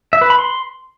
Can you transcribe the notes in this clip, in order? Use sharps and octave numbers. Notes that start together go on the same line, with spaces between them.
E5
B4
B5
C6